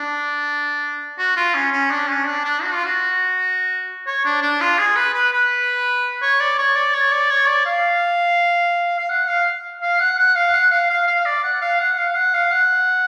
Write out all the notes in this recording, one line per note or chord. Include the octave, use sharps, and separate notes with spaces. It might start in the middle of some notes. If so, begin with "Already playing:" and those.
Already playing: D4
F#4
F4
C#4
C#4
D4
C#4
D4
D4
F#4
F4
F#4
C#5
D4
D4
F4
G#4
B4
B4
B4
C#5
D5
C#5
D5
C#5
D5
C#5
D5
F5
F5
F#5
F5
F5
F#5
F#5
F5
F#5
F5
F5
F5
D5
F#5
F5
F#5
F5
F#5
F5
F#5